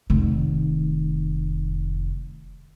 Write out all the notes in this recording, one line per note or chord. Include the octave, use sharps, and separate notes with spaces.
F1 D#3